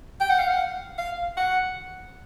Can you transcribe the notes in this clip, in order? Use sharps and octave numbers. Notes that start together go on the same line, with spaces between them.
G5
F#5
F5
F#5
F5
F#5